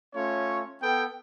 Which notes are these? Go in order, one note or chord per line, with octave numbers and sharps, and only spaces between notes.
A3 C#4 F4 C#5
B3 A4 G5